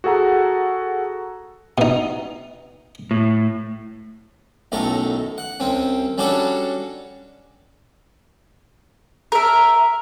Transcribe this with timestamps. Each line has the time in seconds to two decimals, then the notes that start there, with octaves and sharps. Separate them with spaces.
0.04 F#4 G#4 A4 F#5 A#5
1.78 B2 D#4
3.11 A2
4.72 B1 F#2 A2 A3 A#5 C#6
5.38 F#5
5.60 C2 C4 C#4
6.18 G3 C#4 D4 F#4 A4 C#5
9.32 A#4 E5